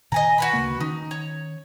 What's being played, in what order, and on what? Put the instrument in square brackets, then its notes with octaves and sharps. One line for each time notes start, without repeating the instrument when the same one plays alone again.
[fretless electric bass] A#2 D#3 [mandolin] D#5 G#5 A#5
[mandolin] F#4 B4 B5
[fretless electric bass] D2 C#3 A#3
[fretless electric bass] D#3 C#4 [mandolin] D#4
[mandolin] C#5